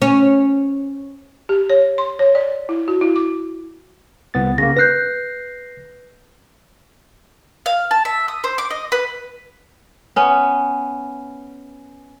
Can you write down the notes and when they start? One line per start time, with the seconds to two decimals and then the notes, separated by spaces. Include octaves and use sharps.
0.02 C#4
1.49 G4
1.70 C#5
1.98 C6
2.19 C#5
2.35 D5
2.69 E4
2.88 F#4
3.01 E4
3.16 D6
4.34 C2 B3 A6
4.58 C#3 A#3 A#6
4.77 B4 F#6 G6 A#6 C7
7.66 F5
7.91 A5
8.05 E5
8.28 D#6
8.44 C5
8.58 D6
8.70 D#5
8.92 B4
10.16 B3 C#4